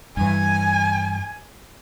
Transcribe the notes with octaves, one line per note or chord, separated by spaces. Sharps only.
G2 E3 G#5